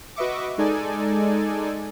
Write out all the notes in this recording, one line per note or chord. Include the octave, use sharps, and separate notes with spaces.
F#4 B4 D#5 E5 C#6 D6
G#3 D#4 A4 D5 G#5